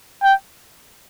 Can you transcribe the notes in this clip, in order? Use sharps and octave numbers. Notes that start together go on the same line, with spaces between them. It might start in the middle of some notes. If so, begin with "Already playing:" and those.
G5